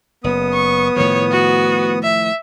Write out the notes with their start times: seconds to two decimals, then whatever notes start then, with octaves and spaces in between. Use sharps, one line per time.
0.24 F#1 B3 D#6
0.53 C#6
0.96 A2 D#3 F3 C#5
1.31 F#4
2.03 E5